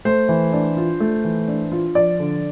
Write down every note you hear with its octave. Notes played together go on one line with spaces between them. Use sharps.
A3 C5
E3
D4
F4
A3
E3
D4
F4
F3 D5
D3